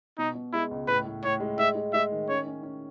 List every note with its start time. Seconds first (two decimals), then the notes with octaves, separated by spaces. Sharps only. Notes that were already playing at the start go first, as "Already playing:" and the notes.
0.18 B2 D#4
0.35 B2
0.53 G#3 E4
0.71 C#2
0.88 A2 B4
1.05 A2
1.24 A2 C#5
1.40 G#3
1.59 G#3 E5
1.75 G#3
1.93 G#3 E5
2.12 D#3
2.29 C#4 C#5
2.47 C#4
2.63 C#4